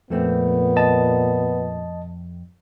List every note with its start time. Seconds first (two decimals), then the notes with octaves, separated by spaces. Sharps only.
0.10 F2 A#2 A3 B3 C4
0.76 D#5 A5